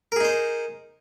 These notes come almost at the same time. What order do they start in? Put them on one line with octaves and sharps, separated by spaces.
A#4 G#4 D#4 C5